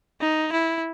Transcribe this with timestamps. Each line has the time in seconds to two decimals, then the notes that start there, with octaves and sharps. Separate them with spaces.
0.21 D#4
0.53 E4